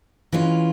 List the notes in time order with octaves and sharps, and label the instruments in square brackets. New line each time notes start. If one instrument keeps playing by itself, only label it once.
[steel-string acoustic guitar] E3 G#3 C#4 F4